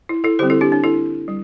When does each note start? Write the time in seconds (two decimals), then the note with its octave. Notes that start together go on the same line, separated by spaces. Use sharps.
0.09 E4
0.24 E4 A4
0.39 D3 G3 C4 G4 C5
0.50 E4 A4
0.61 D4 G4
0.72 D4
0.84 E4 A4
1.28 G3